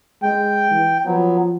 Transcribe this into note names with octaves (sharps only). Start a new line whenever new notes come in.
G#3 G5
E3
F3 F#3 B3